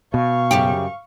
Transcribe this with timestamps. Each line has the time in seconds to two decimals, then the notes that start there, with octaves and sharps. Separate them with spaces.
0.14 B2 F5 C#6
0.51 F#2 C#3 G4